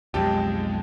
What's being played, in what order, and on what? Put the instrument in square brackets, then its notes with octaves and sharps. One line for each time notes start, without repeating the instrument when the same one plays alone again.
[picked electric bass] B1 F2 [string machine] G#3 [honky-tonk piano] G4 A5